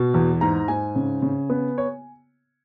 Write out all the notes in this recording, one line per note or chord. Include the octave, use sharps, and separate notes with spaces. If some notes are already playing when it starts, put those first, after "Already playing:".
Already playing: B2
E2
G#2 A#5
G#2 G#5
C#3
C#3
B3
C#5